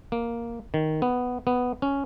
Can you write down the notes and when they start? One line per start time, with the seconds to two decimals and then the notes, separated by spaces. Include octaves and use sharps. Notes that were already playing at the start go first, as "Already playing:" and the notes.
0.12 A#3
0.74 D#3
1.02 B3
1.47 B3
1.82 C#4